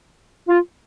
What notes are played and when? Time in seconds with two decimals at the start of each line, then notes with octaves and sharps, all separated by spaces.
0.49 F4